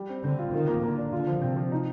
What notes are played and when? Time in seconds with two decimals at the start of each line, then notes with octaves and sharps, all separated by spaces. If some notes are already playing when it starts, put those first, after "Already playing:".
Already playing: G3
0.09 C4
0.24 D3 C4
0.39 F4
0.53 D#3 F4
0.67 A#3
0.83 D3 A#3
0.97 D4
1.12 D3 F4
1.27 F3
1.42 C3 C4
1.56 F3
1.72 D#4